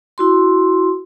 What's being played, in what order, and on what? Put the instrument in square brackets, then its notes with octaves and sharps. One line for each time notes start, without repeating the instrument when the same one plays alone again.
[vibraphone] E4 F#4 C6